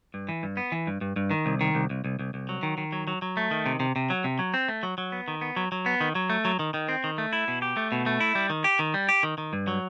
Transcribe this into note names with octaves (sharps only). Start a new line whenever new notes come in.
G2
E3
G2
B3
E3
G2
G2
G2
D#3
C2
D#3
C2
C2
C2
C2
C2
F#3
D#3
D#3
F#3
F#3
F#3
A3
D#3
C3
C3
C3
F#3
C3
F#3
C4
A3
F#3
F#3
B3
D#3
B3
F#3
F#3
B3
D#3
F#3
A3
F#3
D#3
D#3
C4
D#3
A3
E4
B2
G4
A3
B2
A3
E4
G3
D#3
G4
D#3
G3
G4
D#3
D#3
G2
F#3